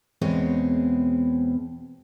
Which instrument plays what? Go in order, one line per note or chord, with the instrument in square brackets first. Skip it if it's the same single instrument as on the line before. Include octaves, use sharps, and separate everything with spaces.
[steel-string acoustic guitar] E2 B2 G#3 C4 C#5